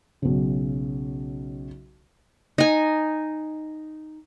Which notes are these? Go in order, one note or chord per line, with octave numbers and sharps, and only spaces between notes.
B1 C#3
D#4 G#5